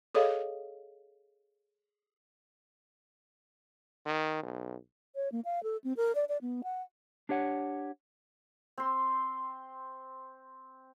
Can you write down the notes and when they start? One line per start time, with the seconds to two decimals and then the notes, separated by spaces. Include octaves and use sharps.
0.15 G#4 A4 C#5 D#5 F5
4.06 D#3
4.43 B1
5.15 C#5
5.32 A#3
5.45 F5
5.63 A4
5.84 C4
5.97 A#4
6.15 D5
6.29 D5
6.42 B3
6.64 F#5
7.29 D4 G4 C#5 F#5
8.78 C4 C6